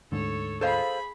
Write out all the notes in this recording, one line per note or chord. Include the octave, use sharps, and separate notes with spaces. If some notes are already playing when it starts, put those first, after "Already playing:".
D2 G#2 D3 A4 C#5
G#4 A4 C5 F5 B5